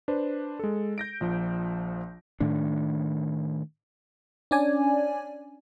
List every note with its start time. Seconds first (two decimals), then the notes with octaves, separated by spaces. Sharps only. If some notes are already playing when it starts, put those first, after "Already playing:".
0.08 D4 B4 C5
0.59 G#3 A4
0.98 G6 A#6 D7
1.21 A#1 F3
2.40 A2 D#3 A3 D4
4.51 C#4 D4 D5 G#5